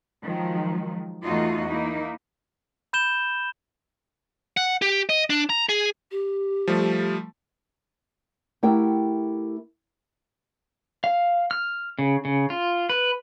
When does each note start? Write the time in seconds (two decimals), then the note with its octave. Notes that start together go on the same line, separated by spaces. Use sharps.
0.24 D#3 F3 F#3 G#3
1.23 E2 A3 D#4 F4 F#4 D#5
1.68 A#3 D#4 E4
2.93 B5 G6 E7 G7
4.57 F#5
4.82 G4
5.09 D#5
5.30 D4
5.50 A#5
5.69 G#4
6.11 G4
6.67 F3 G3 A3
8.63 A3 E4 G4 A#4 F#5 G5
11.04 F5
11.51 F6
11.99 C#3
12.25 C#3
12.50 F4
12.89 B4